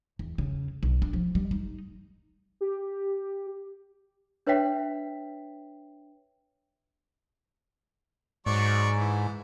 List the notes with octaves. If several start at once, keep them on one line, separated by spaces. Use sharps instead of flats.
E2
C#3
B1
D4
F3
G3
D#4
G4
D4 B4 C#5 E5 G5 B6
G#2 F#3 D5 C#6
E3